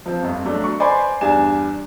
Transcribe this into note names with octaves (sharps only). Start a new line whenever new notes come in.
F3 C4
G1 F2
F#3 A3 D4
C#6
B4 C5 D5 G#5 B5 C6
E2 G2 D4 G#5 E7